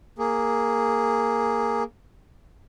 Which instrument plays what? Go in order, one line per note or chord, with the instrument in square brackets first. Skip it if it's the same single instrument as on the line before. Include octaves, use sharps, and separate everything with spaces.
[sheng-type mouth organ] A#3 G#4